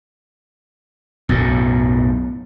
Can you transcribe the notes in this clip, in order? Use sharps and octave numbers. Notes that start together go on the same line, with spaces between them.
B1 F#2 A2